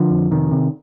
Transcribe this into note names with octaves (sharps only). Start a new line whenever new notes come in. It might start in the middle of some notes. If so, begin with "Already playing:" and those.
Already playing: D3 F3
F2
C3 D#3
C3